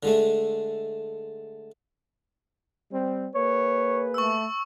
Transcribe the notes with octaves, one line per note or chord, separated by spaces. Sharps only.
D3 G#3 A3
G3 C4
A#3 G#4 B4 C#5
A3 C#6 E6